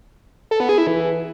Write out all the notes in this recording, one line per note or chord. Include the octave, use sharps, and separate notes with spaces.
A4
B3
G#4
E4
E3